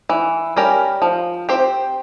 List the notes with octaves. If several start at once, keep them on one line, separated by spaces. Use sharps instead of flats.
E3
G3 C#4 G4 A#4
F3
C4 G4 C5